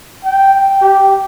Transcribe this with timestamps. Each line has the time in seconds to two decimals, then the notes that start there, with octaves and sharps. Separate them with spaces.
0.25 G5
0.81 G4